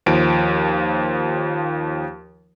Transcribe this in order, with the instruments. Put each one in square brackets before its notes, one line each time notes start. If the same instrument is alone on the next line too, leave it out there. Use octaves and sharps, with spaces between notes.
[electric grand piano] D#2 F3 D7